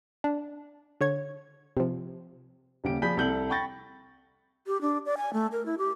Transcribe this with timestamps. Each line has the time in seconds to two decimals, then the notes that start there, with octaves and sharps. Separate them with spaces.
0.24 D4
1.01 D3 C#5 G#6
1.77 C3 F3
2.84 D#1 C#3 G4 D7
3.02 F3 G#4 D5 B5 G6 B6
3.17 C2 A4 G6 F#7
3.49 G5 B5 C#6 G6 A6 A#6
4.67 G4
4.81 D4
5.06 D5
5.17 G#5
5.33 A3
5.52 A#4
5.66 E4
5.78 G4